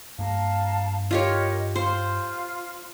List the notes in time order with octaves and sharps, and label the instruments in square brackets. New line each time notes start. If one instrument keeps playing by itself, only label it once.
[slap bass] G2 A#3 [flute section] F5 A5 A#5
[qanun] F4 G4 C#5 [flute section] A#4 D#5
[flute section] F4 [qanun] C5